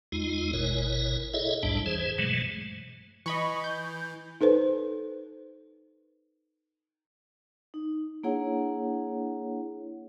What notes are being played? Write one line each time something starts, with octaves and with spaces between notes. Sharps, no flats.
E2 G#3 D#4 F4
G#1 B2 E4 A#4 C#5
E4 G#4 A4 C#5 D#5 E5
B1 E2 G#2 G3 D4 A5
E3 G#4 C5
G2 B2 E3 F#3 G#3 A3
E3 D#5 B5 C#6
G6
D#4 A4 B4 C5
D#4
A#3 D4 E4 G#4 C#5 F#5